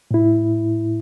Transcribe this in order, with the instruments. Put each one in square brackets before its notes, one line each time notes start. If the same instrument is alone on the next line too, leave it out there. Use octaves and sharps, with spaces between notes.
[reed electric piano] A2 E4